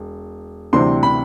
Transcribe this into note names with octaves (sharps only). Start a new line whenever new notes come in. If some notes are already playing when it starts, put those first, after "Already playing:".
Already playing: E1
D2 C3 E3 G3 C4 C6
B5